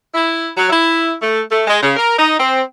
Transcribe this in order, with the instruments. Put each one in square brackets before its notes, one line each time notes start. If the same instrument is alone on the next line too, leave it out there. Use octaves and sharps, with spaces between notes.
[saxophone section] E4
F#3
E4
A3
A3
G#3
C#3
A#4
D#4
C4